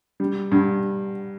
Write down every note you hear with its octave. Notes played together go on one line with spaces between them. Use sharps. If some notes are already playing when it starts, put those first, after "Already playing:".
G3
G2